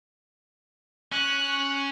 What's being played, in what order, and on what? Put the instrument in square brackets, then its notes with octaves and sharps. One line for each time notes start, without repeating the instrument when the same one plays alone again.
[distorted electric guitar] C#4 [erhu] F#6